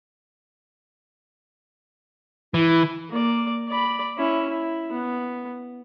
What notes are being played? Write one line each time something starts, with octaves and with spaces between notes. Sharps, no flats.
E3 E4
A#3 D5
D5 B5
C#4 E4
E4
B3